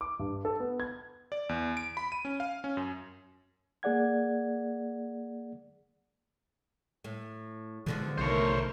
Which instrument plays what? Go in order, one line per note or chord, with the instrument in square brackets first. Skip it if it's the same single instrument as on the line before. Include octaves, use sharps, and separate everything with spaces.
[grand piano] D6
G2
A4
B3
G#6
[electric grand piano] D5
E2
D7
B5
D#7
C#4
F5
C#4
F#2
[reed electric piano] A#3 G#4 D5 F#5 G#6
[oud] A2
[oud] B2 D3 F3 [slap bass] E3 G#3
[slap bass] B1 C3 D#3 [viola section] A3 A#4 [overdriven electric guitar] C5 C#5